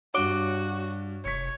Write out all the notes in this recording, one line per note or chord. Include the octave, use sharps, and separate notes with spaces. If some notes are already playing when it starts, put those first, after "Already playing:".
G2 D4 F#4 C#5 D6 D7
F1 C#5 B6 C#7